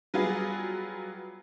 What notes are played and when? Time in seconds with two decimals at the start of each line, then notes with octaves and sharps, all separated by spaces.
0.14 F#3 G3 B3 F4 G#4